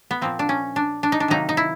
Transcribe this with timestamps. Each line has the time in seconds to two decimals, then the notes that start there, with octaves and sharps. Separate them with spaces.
0.11 B3
0.21 A#2 F3 A#3 C4
0.39 D4
0.49 C#4
0.76 D4
1.03 D4
1.12 D#4
1.20 D4
1.28 C3 D#3 F#3 A#3 D#4
1.49 D#4
1.57 E4